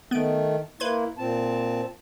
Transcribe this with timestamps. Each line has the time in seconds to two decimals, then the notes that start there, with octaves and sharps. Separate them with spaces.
0.11 D#3 A3 B3 D7
0.80 A#3 E4 B4 C6 G#6
1.18 A#2 C4 A5